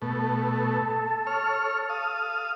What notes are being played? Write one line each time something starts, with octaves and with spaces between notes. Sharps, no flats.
B2 A3 A4
C#5 F6
F5 D#6